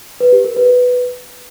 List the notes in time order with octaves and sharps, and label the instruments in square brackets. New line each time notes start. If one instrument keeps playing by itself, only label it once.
[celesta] B4
G4
A#4
B4